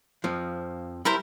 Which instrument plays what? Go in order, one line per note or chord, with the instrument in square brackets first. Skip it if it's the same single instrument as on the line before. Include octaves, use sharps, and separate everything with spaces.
[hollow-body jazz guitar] F2 F3
[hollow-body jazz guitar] G3 [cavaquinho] E4 A#4 C5